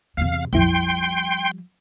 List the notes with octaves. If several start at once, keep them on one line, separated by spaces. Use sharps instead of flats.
E2 C3 F5
A#1 F2 F3 G3 E4 G5 C6